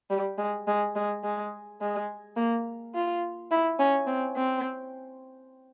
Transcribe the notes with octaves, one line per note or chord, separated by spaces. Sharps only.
G3
G#3
G#3
G#3
G#3
G#3
A#3
F4
E4
C#4
C4
C4